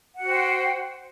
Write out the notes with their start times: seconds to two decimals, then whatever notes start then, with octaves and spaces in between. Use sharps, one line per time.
0.16 F#5
0.20 F#4
0.24 C5
0.28 G5